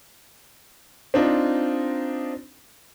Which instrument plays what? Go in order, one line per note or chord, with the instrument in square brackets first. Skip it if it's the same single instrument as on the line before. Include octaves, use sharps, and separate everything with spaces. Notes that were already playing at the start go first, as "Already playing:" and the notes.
[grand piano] C4 D4 D#4 F4